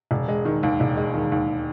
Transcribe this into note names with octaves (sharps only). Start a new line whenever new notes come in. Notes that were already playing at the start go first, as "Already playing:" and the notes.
E1
G#3
D#3
D#2
E1
G#3
D#3
D#2